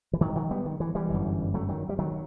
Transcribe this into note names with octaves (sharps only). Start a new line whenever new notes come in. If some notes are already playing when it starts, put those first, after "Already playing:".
E3
D#3 F#3
D#3 F#3
G3 B3
D#3
E3
E3 G3
G1 F#2
F#3 A3
D#3 F#3
G3
D#3 F#3